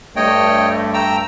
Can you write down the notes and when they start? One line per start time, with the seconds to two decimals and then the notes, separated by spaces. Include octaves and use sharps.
0.16 G2 A3 C#5 D#5 G5
0.94 G5 A#5 E6